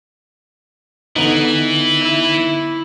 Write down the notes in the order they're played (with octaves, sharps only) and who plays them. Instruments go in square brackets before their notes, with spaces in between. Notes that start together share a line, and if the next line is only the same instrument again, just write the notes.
[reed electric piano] D3 B3 D#4 [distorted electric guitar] E3
[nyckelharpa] E4